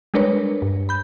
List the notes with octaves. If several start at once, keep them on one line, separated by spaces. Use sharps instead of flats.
G3 G#3 D4 A#4 B4 C#5
G2
B5 G6